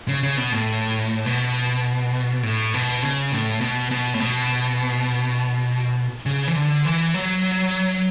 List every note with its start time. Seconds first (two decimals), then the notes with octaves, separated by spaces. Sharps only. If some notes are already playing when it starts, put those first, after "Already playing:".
0.08 C#3
0.23 C#3
0.37 B2
0.52 A2
1.26 B2
2.43 A2
2.74 B2
3.02 C#3
3.32 A2
3.61 B2
3.91 B2
4.14 A2
4.20 B2
6.26 C#3
6.48 E3
6.56 D3
6.85 E3
7.14 F#3